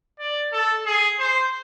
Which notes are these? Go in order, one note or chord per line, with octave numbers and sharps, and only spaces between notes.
D5
A4
G#4
C5